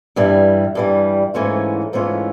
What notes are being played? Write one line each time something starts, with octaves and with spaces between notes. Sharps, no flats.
G2 E3 G3
G2 E3 G3
G#2 E3 A3 C#4 F4
G#2 E3 A3 C#4 F4